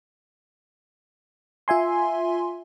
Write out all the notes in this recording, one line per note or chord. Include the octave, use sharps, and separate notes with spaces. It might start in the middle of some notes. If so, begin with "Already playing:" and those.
F4 E5 G#5 C6